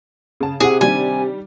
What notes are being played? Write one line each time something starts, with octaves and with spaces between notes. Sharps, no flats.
C#3 A5
C3 E4 G#4 F#5
D#3 G3 D4 G#5